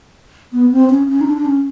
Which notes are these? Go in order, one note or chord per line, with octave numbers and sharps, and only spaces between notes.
B3
C4
C#4
C#4
D#4
D4
D4
C#4